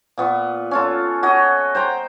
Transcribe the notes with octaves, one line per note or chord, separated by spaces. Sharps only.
A#2 B3 C#6
C#4 F4 A4
F#4 C#5 D#5
C5 G5 A#5